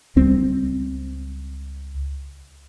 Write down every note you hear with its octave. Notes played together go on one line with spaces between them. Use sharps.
C#2 G3 C4